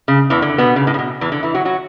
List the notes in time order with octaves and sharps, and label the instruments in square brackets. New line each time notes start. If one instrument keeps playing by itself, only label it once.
[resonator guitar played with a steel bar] C#3
E2 E3
D3
B2 B3
C#3
A2
C#3
B2
E2 E3
D3 D4
E3 E4
F#3 F#4
F#3 F#4